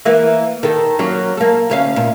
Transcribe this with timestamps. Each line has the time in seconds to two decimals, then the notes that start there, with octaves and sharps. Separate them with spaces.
0.05 E3 A#3
0.63 D#3 A4
0.99 F#3 A#3 C#4
1.37 A#3 A4
1.70 D2 C#4 F5
1.96 A#2